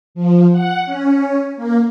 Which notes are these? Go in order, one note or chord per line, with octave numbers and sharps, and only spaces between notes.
F3
F#5
C#4
A#3